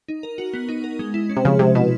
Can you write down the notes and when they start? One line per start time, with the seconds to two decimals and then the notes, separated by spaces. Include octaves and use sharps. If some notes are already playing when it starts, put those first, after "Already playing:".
0.08 D#4
0.23 A#4
0.38 F#4
0.54 B3
0.69 D#4
0.84 A#4
0.99 G#3
1.14 E4
1.29 C#4
1.37 C3
1.45 C#3 F3
1.59 C3 G#3
1.75 B2 E4